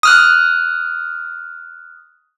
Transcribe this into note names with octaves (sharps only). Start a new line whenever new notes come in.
D#6 F6 F#6